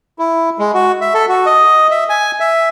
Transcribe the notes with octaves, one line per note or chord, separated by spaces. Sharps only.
E4
G#3
F#4
E5
A4
F#4
D#5
E5
G#5
E5